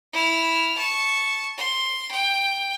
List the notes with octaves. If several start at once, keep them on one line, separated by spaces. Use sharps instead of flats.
E4 F6
A5 C#6
C6
G5